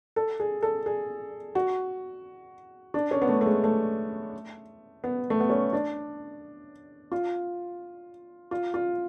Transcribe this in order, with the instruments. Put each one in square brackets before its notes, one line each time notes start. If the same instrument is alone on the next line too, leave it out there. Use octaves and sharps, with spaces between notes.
[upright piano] A4
G#4
A4
G#4
F#4
D4
C#4
B3
A3
A3
G#3
A3
B3
A3
B3
C#4
D4
F4
F4
F4